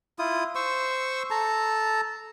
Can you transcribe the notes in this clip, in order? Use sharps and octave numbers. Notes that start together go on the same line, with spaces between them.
E4 F4 D#6
C5 C#6 E6
A4 A5 A#5